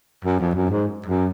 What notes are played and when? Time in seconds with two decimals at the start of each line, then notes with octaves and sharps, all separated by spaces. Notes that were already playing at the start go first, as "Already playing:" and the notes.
0.25 F#2
0.40 F2
0.55 F#2
0.70 G#2
1.06 F#2